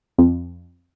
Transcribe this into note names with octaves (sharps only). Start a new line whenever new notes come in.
F2